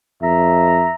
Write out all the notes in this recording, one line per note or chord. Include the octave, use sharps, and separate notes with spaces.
F2 E5 A#5